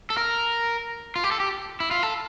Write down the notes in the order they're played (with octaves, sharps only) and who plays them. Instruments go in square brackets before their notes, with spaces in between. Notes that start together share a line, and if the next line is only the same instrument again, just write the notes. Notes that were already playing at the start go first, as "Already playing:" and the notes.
[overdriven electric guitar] A4
A#4
F4
G4
A4
G4
E4
F4
A4